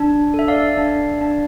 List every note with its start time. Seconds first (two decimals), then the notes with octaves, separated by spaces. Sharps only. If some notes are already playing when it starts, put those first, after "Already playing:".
Already playing: D4
0.34 A4
0.39 E5
0.48 D5 F5
0.77 D4
1.21 D4